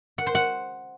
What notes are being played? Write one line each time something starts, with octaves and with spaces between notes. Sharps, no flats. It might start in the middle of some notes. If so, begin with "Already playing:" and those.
F#5
C5
F#5